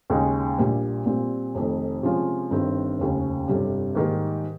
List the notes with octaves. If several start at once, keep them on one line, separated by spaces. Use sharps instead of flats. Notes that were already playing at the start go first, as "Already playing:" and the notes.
D#2 C#3 G#3 D#4
A#1 A#2 G3
A#2 G3 C4
F1 F2 D#3
C3 F3 G#3 C#4 F4
G1 G2 D#3 G3 C4
F1 D#2 C#3
G1 F2 C3 G3
G#2 D#3 G3 A#3